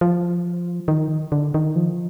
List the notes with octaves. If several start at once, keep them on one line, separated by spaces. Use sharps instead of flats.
F3
D#3
D3
D#3
F3